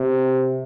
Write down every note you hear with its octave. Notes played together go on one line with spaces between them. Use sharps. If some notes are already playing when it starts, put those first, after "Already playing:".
Already playing: C3